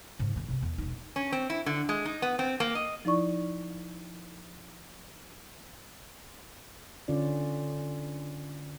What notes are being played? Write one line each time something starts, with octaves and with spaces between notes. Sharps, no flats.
G#2 C#3
D#3 C#4
C3 C#4
E2
E1 D#4
C#4
C4
E4
D3
G#3
D#4
B3
C4
A#3
D#5
F3 D#4 E4 D5 C#6
D3 C#4 F4 D5